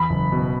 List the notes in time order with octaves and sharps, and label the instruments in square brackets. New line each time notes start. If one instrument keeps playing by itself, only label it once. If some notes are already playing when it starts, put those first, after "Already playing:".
Already playing: [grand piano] E2 [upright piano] B5
[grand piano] F#1
B2